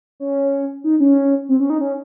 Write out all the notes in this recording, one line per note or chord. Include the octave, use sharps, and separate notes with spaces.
C#4
D#4
C#4
C4
C#4
D#4
C#4